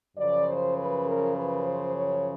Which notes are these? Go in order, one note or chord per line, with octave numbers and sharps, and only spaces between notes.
F#2 C#3 F3 D5
C5
B4
A#4
B4
C5
C#5